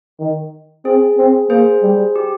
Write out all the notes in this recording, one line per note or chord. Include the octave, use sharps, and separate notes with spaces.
D#3
C4 G#4
C4
A#3 G#4 C5
G3
G4